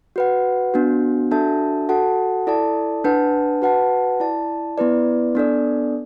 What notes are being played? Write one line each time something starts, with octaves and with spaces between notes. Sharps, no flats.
F#4 B4 F#5
B3 D4 F#4
D4 F#4 A4 E5 A5
F#4 A4 F#5 A5
E4 A4 D5 A5
D4 B4 F#5 A5
F#4 B4 F#5 A5
E4 D5 A5
B3 E4 B4 D5
B3 D4 A4 D5